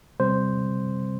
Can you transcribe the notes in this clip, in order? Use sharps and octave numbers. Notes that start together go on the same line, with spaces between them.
C3 G3 C4 C5